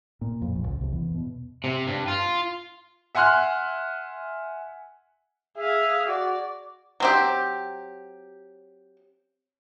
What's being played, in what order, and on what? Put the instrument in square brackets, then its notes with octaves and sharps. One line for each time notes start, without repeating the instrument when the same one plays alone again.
[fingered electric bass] A#2
F2
A#1
C#2
C2
E2
B2
[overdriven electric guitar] C3
G2
F4
[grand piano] E5 F#5 G#5 C6 F6 F#6
[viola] G#4 F5 [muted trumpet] E5
[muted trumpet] F#4 [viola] D5
[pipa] F#3 C4 G4